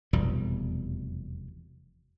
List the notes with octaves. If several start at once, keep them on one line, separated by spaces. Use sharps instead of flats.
F1 E2 B2 G3